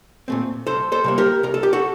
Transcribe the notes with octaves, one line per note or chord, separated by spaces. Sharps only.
A#2 A3 C4
C2 A4 C5
A4 C5
C3 G3 A#3
G4 A#4
C2 A#4
A4
G4
F#4 A4